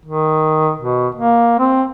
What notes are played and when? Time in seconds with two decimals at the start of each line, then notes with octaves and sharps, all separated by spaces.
0.05 D#3
0.78 B2
1.15 A#3
1.59 C4